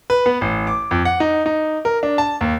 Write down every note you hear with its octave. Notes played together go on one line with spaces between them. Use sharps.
B4
B3
A1
D6
F2
F#5
D#4
D#4
A#4
D4
A5
D#2